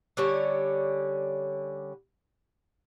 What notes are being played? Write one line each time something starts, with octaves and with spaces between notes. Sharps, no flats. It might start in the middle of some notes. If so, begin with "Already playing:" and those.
D3 G3 C#4 C#5